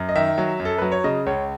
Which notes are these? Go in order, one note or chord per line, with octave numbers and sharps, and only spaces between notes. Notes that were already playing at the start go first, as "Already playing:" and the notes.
Already playing: F#2
D#5
D#3 E5
F#3
F#2
A4
F#3 B4
C#5
C#3 D#5
C#2 C#5